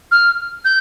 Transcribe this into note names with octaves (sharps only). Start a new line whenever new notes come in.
F6
G6